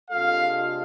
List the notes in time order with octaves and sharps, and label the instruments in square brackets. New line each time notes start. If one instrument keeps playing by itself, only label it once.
[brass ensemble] C3 G#3 D4 F4 A4 [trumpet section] F5